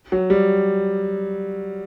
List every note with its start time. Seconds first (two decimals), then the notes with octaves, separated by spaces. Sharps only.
0.12 F#3
0.30 G3